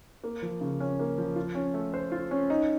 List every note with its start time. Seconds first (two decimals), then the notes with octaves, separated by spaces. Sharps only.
0.24 A#3
0.42 F3
0.61 C#3
0.80 C#4
0.99 A#3
1.18 F3
1.36 F4
1.55 C#4
1.74 A3
1.94 C5
2.12 F4
2.31 C#4
2.50 D#4